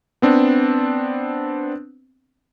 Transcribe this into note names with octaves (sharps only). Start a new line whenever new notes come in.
B3 C4 D4